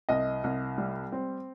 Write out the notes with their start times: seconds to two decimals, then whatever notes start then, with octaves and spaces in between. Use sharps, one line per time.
0.09 C2 D#5
0.44 C2
0.78 G3
1.12 C4